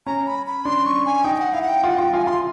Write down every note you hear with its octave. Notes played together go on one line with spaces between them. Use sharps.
C#4 A#5
B5
B5
D4 C6
C#6
G#5
D#4 G5
G5
F#5
E4 F5
F#5
G5
F4 F#5
F4 G5
F4 G#5
F4 C6